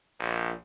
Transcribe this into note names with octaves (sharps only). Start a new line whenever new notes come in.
A#1